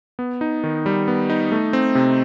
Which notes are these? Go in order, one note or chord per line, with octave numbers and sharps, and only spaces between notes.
B3
D#4
D#3
G3
B3
D#4
A3
C4
C3